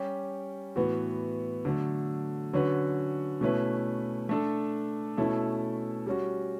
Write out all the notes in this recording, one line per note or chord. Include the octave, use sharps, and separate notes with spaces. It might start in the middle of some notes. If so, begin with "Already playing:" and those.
Already playing: G3 C#4 G4
A2 E3 B3 F#4
D3 F#3 A3
D3 F#3 C#4 F#4 B4
B2 A3 C#4 E4 B4
A3 D4 A4
B2 A3 C#4 E4 A4
G3 C#4 F#4